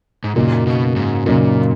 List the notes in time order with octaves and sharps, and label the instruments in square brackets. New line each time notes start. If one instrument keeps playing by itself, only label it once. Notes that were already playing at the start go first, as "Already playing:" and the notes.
[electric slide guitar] G#2
[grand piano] F#2 C#3 F#3 A#3 D#4 [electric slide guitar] A#2
[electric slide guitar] B2
G#2
[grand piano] F#2 C#3 F#3 A#3 D#4 [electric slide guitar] A#2